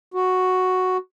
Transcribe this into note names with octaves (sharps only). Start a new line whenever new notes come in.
F#4